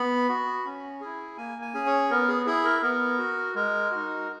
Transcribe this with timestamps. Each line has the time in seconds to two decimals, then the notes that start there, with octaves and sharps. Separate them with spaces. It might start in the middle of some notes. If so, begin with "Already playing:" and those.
Already playing: B3 B5
0.29 F#4
0.65 C#4
1.01 E4 G#4
1.37 A#3 G#5
1.62 G#5
1.74 C#4 G#4
1.86 C#5
2.10 B3 A#4
2.28 G#4
2.46 E4 G#4
2.65 A#4
2.82 B3 A#4
3.18 F#4
3.55 G#3 A#4
3.91 D#4 F#4